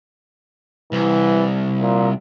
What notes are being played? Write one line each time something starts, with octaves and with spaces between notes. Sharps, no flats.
C2 E3
A#2